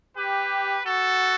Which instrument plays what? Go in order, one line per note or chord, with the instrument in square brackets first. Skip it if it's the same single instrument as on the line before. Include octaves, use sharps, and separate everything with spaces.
[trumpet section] G4 [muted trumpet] B4
[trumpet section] F#4 [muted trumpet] A4